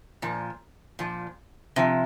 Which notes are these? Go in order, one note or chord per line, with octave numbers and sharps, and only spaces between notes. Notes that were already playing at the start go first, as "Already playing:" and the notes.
A#2 F3
A#2 F3
C3 F3